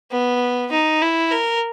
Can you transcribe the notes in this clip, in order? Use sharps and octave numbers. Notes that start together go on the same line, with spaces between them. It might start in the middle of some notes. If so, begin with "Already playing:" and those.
B3
D#4
E4
A#4